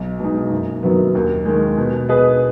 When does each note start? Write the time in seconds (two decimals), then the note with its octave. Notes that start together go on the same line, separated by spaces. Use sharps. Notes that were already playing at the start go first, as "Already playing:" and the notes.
Already playing: B1
0.20 B2 G#3 D#4
0.51 F#1
0.83 F#2 D#3 F#3 B3
1.15 D#2
1.45 D#3 G#3
1.77 B2
2.09 B3 G#4 B4 D#5